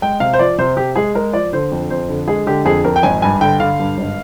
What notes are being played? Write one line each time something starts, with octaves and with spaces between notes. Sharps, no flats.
G#3 G5
C3 F5
C5
F3 D5
C3 C5
C3 G4
G#3 G#4
G#3 A#4
F3 D5
D3 C5
F2
F2 C5
D3
G#3 G#4
D3 G4
F2 G#4
F2 A#4
G5
G#1 G#5
G2 G#5
D3 G5
D3 F5
G2
G#1